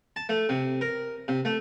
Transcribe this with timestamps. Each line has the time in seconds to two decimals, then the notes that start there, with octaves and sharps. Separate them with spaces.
0.16 A5
0.29 A3
0.49 C3
0.81 A#4
1.28 C3
1.45 A3